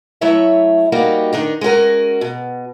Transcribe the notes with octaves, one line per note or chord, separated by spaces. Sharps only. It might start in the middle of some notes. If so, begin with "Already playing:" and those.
F#3 A3 E4 C#5 E5
G3 A#3 D#4 F#4 G4
D#3 D4 D#4
G#3 C#4 F#4 A#4
B2